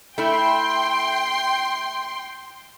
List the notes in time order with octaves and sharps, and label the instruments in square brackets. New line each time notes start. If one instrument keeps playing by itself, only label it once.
[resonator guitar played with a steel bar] A3 E4 [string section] G5 C6